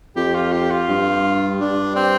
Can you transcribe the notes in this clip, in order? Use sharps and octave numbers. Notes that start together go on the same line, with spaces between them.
F2 G4
F4
G4
F4
G2
G2 D4
C4